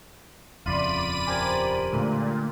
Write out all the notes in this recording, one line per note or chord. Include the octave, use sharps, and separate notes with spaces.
D#1 F2 C#3 F4 D5 B5 D#7
G4 A#4 C5 G#5 A#5 G#6
A#2 D3 G#3 A3